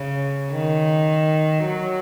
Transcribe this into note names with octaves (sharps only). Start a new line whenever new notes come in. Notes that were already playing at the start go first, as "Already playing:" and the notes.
Already playing: C#3
D#3
F#3